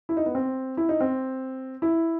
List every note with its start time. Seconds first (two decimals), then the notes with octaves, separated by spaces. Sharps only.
0.09 E4
0.17 D#4
0.26 B3
0.35 C4
0.77 E4
0.89 D#4
1.01 C4
1.82 E4